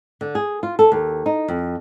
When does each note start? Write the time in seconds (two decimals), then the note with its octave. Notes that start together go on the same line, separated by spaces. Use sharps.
0.21 D3
0.35 G#4
0.63 F4
0.79 A4
0.92 D#2
1.26 D#4
1.48 F2